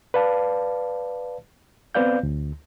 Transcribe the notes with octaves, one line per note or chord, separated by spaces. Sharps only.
B4 D5 F5 A5
B3 C4 B4 D5 F5 G6
D2